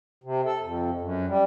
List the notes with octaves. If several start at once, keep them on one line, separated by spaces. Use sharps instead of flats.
C3
A4
F2
F#2
G3